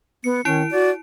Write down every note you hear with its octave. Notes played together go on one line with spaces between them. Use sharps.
B3 C#7
D#3 C#4 E4 D7
F#4 D5